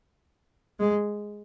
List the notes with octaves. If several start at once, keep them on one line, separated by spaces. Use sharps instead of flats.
G#3